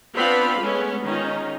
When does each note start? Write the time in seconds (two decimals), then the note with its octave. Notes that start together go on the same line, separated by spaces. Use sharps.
0.15 B3 C4 D4 F4 F5 B5
0.59 G#3 A3 B3 C#4
1.03 D#3 G#3 C#4 D#4 F4